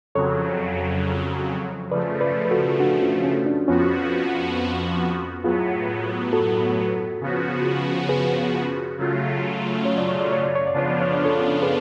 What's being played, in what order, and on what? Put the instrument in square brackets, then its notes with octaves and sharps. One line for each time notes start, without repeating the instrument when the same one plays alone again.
[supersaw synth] F2 C#3 F#3 [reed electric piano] A4 C#5
[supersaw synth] C#3 F3 A3 [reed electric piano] B4 D5
[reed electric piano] B4 D5
B4
F#4 A4
D4 F#4
C#4 F4
C#4
D4
[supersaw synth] F2 F3 B3 F#4 [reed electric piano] C#4 F4
[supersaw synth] A2 F#3 B3 [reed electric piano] F4 G#4
[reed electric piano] F#4 A4
[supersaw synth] C#3 F3 B3 F#4
[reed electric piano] G#4 B4
[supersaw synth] C#3 F#3 A3 F4
[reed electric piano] C#5
D5
C#5
D5
C#5
D5
C#5
D5
[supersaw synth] C#3 F3 B3 D4 F4 [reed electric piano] C#5
[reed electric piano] D5
C#5
D5
A4 C#5
G#4 B4